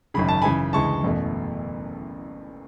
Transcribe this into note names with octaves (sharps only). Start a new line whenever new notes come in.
G#1 F#2 C#3 B5
A5
F#2 C#3 E3 G#5 B5
D2 C#3 E3 G#3 A5 C#6
F#1 E2 B2 A3